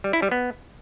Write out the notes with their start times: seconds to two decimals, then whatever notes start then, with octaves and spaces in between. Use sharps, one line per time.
0.04 G3
0.13 E4
0.22 G3
0.31 B3